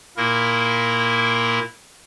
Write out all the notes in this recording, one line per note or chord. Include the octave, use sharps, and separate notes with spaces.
A#2 A#3 E4 A#4